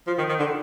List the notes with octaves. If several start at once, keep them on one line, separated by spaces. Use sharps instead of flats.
F3
D#3
D#3
D3